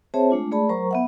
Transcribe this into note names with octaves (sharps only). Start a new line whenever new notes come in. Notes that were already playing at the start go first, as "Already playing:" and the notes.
C4 G#4 C5 C#5 E5 A5
G#3 A3 D4 F4
A3 G#4 D5 A5 B5
F#3 A#4 C5 A#5 C#6
B3 E5 F#5